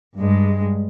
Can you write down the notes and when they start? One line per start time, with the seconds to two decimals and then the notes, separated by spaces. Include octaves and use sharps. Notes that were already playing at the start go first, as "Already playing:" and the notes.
0.17 G2 G#3